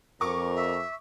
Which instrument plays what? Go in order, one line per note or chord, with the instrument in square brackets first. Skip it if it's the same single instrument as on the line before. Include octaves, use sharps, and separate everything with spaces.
[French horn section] F2 [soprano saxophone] A#4 [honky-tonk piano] C#6 D6
[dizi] E5